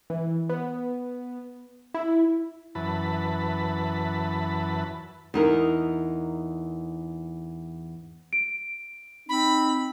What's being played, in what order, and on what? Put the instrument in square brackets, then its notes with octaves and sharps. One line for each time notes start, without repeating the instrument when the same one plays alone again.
[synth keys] E3
B3
E4
[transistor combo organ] F#2 E3 B4 A5 B5
[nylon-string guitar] E2 D#4 A#4
[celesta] D7
[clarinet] C4 [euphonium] D#4 [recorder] B5